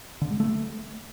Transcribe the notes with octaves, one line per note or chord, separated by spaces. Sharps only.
D3
G#3
A3